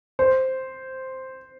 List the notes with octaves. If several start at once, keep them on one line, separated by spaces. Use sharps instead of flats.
C5